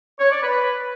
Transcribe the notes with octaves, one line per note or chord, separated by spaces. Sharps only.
C#5
D5
B4